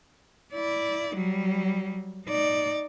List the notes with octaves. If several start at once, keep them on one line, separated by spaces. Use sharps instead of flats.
E4 D5
F#3 G3
D#4 D5